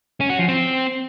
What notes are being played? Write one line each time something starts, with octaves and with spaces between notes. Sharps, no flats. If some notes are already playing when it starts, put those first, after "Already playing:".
C#4
F#4
F3
C4